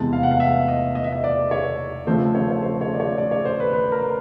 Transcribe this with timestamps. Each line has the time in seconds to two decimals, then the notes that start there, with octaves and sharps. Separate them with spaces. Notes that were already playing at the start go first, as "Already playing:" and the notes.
Already playing: E2 C3 E3 G#3 A5
0.13 F5
0.23 F#5
0.31 F5
0.40 E5
0.68 D#5
0.95 D#5
1.04 E5
1.12 D#5
1.24 D5
1.51 C#5
2.07 C#3 F3 A3 C4 C5
2.35 C#5
2.51 C#5
2.62 C5
2.81 C#5
2.94 D5
3.00 C#5
3.18 D5
3.31 C#5
3.45 C5
3.60 B4
3.73 B4
3.92 A#4